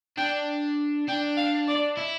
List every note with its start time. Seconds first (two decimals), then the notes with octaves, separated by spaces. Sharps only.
0.18 D4 G5
1.08 D4 G5
1.37 F5
1.68 D5
1.97 E4